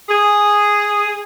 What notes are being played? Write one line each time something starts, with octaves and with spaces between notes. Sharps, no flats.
G#4